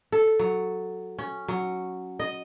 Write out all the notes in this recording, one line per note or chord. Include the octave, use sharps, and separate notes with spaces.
A4
F#3
C#4
F#3
D#5